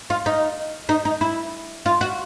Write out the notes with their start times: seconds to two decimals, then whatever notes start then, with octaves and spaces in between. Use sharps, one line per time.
0.10 F4
0.26 D#4
0.89 D#4
1.05 D#4
1.21 E4
1.86 F4
2.01 F#4